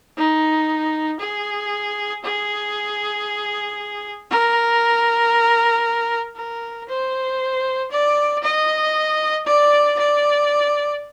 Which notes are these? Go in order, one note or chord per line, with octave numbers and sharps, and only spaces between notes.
D#4
G#4
G#4
A#4
A#4
C5
D5
D#5
D5
D5